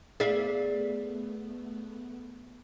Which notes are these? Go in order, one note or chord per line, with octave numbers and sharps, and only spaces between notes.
A3 B3 G#4 D5 E5 F5